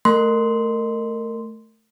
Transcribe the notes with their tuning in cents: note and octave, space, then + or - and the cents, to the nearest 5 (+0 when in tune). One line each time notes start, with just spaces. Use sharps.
A3 +0 A#4 -15 C6 -10